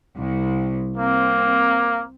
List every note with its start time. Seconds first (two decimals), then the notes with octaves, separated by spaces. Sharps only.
0.16 C2
0.98 A#3 C4